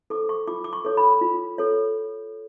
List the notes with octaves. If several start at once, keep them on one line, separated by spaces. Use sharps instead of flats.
A4 C5 D6
C#6
F4 D6
D6
C#6
A4 C#5
B5
F4
A4 C#5